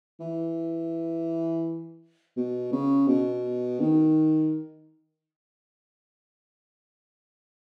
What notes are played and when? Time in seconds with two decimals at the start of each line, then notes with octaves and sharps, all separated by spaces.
0.20 E3
2.37 B2
2.72 C#3
3.08 B2
3.80 D#3